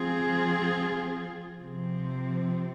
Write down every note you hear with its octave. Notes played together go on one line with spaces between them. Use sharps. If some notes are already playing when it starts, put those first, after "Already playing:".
Already playing: F3 C4 F4 G#4
C3 F3 C4